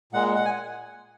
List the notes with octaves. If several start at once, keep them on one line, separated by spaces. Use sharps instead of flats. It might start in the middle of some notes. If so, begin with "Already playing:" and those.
A#2 G#3 F#5
F#5
G#5